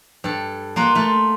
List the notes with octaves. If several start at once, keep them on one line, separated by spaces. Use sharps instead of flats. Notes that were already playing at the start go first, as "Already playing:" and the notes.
G2 A4
A#3 F4 A#4 F#5
A3 F4